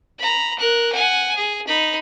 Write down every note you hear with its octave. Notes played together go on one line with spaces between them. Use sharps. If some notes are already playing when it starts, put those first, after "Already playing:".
A#5 B5
A#4 F#6
F#5 G#5
G#4
D#4 B5